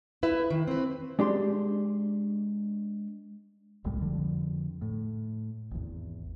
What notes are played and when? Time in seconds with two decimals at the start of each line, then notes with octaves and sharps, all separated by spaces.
0.23 E4 B4 E5
0.50 D#3
0.68 C4 B4
1.19 G#3 D4 G4 C6
3.84 E1 C2 A2 G3
4.01 F2 D3 F3
4.82 A2
5.71 G#1 E2